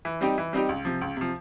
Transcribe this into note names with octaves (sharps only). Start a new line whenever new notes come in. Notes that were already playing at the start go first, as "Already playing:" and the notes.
E3
G3 C4 D#4 G4
E3
G3 C4 D#4 G4
C#2
C3 F3
C#2
C3 F3